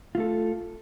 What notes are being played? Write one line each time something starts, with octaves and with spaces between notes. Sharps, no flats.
A3 F4 A4